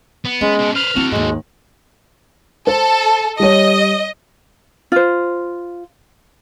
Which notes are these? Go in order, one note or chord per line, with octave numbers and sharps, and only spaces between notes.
B3
G#3 C#4
B2
B4 C5 F6
C4 E4 F#4 A4
D#2 G#2 G#3
A4 C5
G3 C#5 D#5
F4 C5